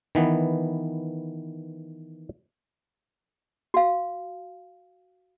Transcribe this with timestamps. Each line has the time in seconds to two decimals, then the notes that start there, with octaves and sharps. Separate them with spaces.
0.15 D#3 E3 B3
3.74 F#4 F5